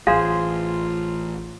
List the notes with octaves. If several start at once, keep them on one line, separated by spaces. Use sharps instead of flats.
A1 F4 G#4 C5 F5